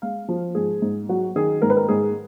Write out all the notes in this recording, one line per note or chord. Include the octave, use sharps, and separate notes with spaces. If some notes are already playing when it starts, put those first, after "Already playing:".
G#3 F5
F3
G#2 G#4
G#2
F#3 F#4
D#3 G#4
G#2 A#4
B4
A#4
G#2 G#4